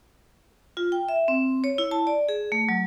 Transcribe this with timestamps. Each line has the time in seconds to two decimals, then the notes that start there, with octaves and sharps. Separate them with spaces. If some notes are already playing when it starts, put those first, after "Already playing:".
0.77 F4
0.92 G5
1.09 E5
1.28 C4
1.64 C#5
1.78 E4
1.91 A5
2.07 D5
2.29 G#4
2.52 A3
2.69 F#3